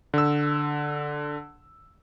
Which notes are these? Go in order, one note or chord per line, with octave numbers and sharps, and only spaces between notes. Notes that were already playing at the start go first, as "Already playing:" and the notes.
D3 E6